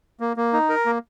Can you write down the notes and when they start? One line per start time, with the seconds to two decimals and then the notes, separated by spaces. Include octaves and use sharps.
0.20 A#3
0.37 A#3
0.53 D#4
0.69 A#4
0.86 A#3